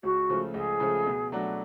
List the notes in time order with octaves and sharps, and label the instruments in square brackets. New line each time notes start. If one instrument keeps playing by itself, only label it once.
[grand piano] C#2 [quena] F#4
[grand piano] C#3 F3 A3
[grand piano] C#2 [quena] G#4
[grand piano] C#3 F3 A3
B2
F#3 A3 D4 F#4